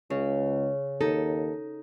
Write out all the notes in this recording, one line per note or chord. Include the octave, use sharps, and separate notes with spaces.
C#2 C#3
D#2 D#4 A4